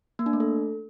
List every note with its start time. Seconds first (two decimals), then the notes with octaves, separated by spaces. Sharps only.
0.19 A#3
0.26 D4
0.33 A3
0.40 A4